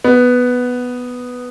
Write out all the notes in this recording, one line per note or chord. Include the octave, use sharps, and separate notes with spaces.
B3